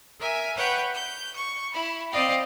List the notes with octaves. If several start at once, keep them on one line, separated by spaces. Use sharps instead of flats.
A#4 E5 G#5
B4 C#5 F#5 G5 G6
G6
C#6
E4 B5
C4 C5 D5 D#5 F5 G5